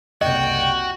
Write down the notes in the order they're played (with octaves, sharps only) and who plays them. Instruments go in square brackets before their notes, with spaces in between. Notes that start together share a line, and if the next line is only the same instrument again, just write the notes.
[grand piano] F#1 C2 [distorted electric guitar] F#4 [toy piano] D#5 [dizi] G5